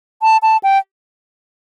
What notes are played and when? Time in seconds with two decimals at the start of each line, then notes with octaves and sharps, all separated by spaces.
0.23 A5
0.43 A5
0.63 G5